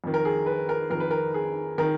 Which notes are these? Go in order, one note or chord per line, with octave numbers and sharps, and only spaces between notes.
F2 D#3
A#4
G#4
B4
A#4
F2 D#3 A#4
B4
A#4
G#4
D#3 A#4